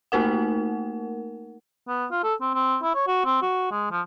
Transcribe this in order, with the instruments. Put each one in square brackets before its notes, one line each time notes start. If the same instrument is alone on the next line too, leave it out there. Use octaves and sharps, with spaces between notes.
[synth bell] A3 A#3 D#4 A#4 F#5
[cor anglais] B3
F4
A4
C4
C4
E4
C#5
F#4
C4
F#4
G#3
F3